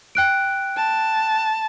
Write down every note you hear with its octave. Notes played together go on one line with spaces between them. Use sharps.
G5 F#6 D7
A5